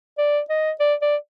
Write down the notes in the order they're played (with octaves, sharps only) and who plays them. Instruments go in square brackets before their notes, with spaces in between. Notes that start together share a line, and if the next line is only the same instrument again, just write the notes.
[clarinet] D5
D#5
D5
D5